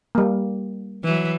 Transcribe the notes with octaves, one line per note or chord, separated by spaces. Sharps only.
G3 A#3
E3 F#3